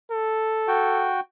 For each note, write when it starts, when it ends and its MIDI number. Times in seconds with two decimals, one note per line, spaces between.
0.11 1.13 69
0.68 1.20 66
0.68 1.20 79